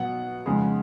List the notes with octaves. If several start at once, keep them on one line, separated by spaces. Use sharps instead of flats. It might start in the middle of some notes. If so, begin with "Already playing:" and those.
Already playing: B2 F#3 F#5
F2 C#3 G#3